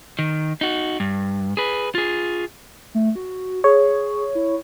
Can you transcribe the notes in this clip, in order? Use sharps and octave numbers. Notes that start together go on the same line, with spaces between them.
D#3
D#4 F#4
G2
G#4 B4
F4 G#4
A3
F#4
G#4 C#5
E4